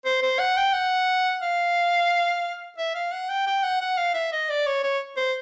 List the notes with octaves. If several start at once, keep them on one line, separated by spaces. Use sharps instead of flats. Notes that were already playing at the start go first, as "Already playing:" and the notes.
C5
C5
F#5
G5
F#5
F5
E5
F5
F#5
G5
G5
F#5
F#5
F5
E5
D#5
D5
C#5
C#5
C5